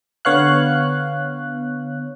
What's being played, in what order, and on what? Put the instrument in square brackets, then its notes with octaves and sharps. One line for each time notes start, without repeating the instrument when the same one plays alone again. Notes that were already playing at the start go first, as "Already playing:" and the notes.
[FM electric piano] D3 B3 C#5 F5 F#6